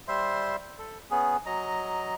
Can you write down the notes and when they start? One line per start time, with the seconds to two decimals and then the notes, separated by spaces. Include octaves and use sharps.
0.08 G3 C5 E5 C6
0.79 A4
1.11 B3 C#4 G#4
1.46 F#3 D#5 A#5